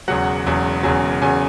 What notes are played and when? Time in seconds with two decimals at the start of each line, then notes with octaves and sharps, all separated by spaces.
0.08 E1 E2 C#3 F#3 F#5
0.46 E1 E2 C#3 F#3
0.83 E1 E2 C#3 F#3 G#5
1.21 E1 E2 C#3 F#3 G#5